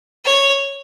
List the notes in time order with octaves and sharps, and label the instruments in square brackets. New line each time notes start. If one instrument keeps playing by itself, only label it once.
[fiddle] C#5